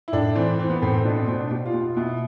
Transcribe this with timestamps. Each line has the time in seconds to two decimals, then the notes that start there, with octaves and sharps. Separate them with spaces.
0.08 E4
0.13 A2 D4
0.35 E3 C4
0.59 E3 C4
0.70 B3
0.82 A2 C4
0.93 C4
1.05 B2 D4
1.16 C4
1.28 B2 C4
1.39 D4
1.51 B2 G4
1.66 F4
1.74 B2
1.82 F4
1.97 B2 E4